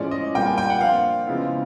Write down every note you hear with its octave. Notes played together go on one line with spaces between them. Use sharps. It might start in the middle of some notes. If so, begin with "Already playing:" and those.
Already playing: A2 F3 G#3 C#4 D5
D#5
A#2 G3 A#3 G5
G#5
G5
F#5
F3 A#3 D4 F4 F5
C#3 F3 G#3 B3 E4